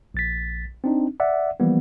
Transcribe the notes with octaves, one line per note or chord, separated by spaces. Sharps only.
A#1 A6 B6
C4 D4 D#4
D5 E5 F#5
E3 F3 G3 A#3 B3